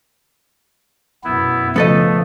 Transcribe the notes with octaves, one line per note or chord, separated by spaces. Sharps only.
F#2 B2 B3 E4
C#3 F3 A3 B3 A4 D#5